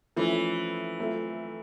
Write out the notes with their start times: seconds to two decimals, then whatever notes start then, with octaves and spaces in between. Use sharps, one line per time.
0.16 E3 F3 A3 C#4 E4
0.99 F#3 A3 C4 F4